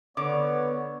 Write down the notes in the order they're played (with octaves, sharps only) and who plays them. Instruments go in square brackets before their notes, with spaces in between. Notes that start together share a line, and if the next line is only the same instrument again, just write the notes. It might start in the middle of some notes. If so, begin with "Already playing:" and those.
[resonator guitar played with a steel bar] D3 [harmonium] B3 [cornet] C#5 [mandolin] D6